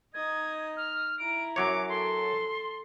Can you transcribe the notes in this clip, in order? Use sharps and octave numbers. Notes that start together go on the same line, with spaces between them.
D#4 D#5 G#6
F6
E4 A#5 D7
F#2 F#3 C#5 D6
A4 C6